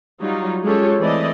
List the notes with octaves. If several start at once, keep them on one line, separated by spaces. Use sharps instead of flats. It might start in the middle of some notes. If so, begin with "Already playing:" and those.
F#3 G3 D#4 F4
G#3 C#4 F4 G4 A4 C#5
E3 A3 C4 E4 D5 D#5